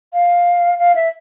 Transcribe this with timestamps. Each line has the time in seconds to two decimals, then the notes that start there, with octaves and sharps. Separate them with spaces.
0.13 F5
0.79 F5
0.95 E5